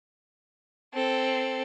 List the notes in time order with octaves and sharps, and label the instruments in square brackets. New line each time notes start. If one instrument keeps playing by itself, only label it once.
[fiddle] C4 A4